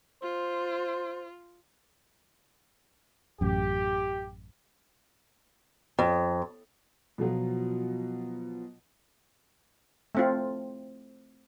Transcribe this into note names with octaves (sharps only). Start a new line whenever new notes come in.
F4 C5
A1 F#2 G4
F2
B2 F3 F#3 F4
A3 C4 F4